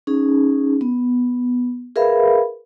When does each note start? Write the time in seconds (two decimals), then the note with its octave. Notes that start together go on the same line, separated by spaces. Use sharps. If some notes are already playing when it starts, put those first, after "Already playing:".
0.07 C#4 D#4 G#4
0.81 B3
1.96 G#4 A#4 B4 E5 F5 B5